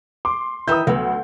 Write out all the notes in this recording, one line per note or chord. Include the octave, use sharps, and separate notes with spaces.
C6 D6
D#3 E3 E5 D#6 G6
D2 F#3 B3 E6